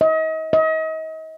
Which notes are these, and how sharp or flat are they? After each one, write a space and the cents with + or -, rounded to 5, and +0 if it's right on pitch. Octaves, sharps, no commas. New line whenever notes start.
D#5 +35
D#5 +35